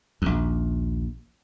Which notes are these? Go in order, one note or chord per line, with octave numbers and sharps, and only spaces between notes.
A#1 D#2